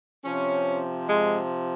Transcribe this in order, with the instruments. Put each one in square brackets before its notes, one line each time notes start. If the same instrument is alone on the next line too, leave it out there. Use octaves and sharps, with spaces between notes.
[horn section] C3 F3 C#4
G#3